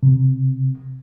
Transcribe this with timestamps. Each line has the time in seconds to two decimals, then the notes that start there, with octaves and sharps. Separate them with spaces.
0.03 C3